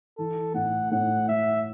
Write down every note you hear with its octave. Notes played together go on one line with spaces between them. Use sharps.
E3 A4
A2 F#5
A2 F#5
A3 E5